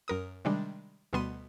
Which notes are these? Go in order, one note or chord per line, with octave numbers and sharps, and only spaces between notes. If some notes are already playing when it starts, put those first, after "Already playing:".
F#2 A#4 D#6
C3 D#3 G3 G#3 D4
D2 B2 G3 B3 C6 D#7